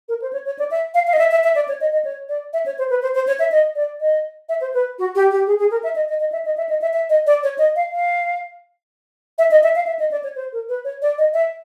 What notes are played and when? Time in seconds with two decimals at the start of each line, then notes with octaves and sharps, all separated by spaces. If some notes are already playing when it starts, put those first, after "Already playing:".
0.09 A#4
0.22 C5
0.33 C#5
0.46 C#5
0.59 D5
0.71 E5
0.94 F5
1.07 F5
1.13 D#5
1.19 E5
1.31 E5
1.44 E5
1.55 D5
1.68 C#5
1.81 D#5
1.92 D#5
2.05 C#5
2.29 D5
2.53 E5
2.66 C#5
2.78 C5
2.90 B4
3.02 C5
3.15 C5
3.27 C#5
3.39 E5
3.51 D#5
3.75 D5
4.01 D#5
4.49 E5
4.61 C5
4.74 B4
4.99 F#4
5.15 G4
5.31 G4
5.47 G#4
5.59 G#4
5.71 A#4
5.83 E5
5.96 D#5
6.09 D#5
6.20 D#5
6.32 E5
6.45 D#5
6.57 E5
6.69 D#5
6.81 E5
6.93 E5
7.09 D#5
7.26 D5
7.43 C#5
7.58 D#5
7.76 F5
7.92 F5
9.38 E5
9.51 D#5
9.63 E5
9.75 F5
9.87 E5
9.99 D#5
10.11 D5
10.23 C#5
10.36 C5
10.52 A#4
10.69 B4
10.84 C#5
11.02 D5
11.18 D#5
11.34 E5